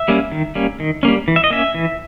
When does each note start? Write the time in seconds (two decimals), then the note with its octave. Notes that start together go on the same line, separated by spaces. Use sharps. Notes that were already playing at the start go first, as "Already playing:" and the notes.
Already playing: E5
0.08 G3 A#3 C#4
0.32 D#3
0.55 G3 A#3 C#4
0.80 D#3
1.03 G3 A#3 C#4
1.28 E3
1.36 E5
1.44 D#5
1.50 A#3 C#4 E5
1.74 E3